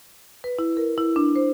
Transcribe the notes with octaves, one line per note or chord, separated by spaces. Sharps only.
B4
E4
A#4
E4
D4
C5